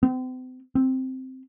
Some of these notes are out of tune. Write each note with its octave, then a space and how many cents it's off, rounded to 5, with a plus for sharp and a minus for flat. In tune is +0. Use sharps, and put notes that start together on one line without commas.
C4 -40
C4 -5